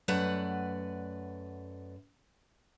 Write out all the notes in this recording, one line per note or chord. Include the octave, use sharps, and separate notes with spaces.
F#2 A3 B4 D5 F#5